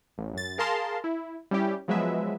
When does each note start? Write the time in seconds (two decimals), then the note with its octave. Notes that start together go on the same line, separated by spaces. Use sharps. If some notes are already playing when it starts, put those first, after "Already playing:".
0.18 A1
0.34 F#2 A6
0.58 G#4 A#4 F5 A5 A#5 C6
1.04 E4
1.51 G3 C#4 E4 G4
1.88 F3 F#3 G#3 B3 B4 E5